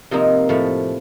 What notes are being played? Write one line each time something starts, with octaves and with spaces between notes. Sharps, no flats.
C3 F3 A#3 D#4
A2 F3 A3